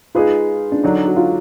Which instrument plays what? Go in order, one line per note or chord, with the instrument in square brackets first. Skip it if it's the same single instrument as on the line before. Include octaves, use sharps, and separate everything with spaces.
[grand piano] G#3 D#4 G#4 B4 [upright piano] F4
[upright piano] D4
[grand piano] D3 F#3 D4 [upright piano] D#4
[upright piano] F#4
F4